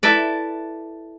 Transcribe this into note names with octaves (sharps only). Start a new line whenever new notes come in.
E4 A4 B4 D5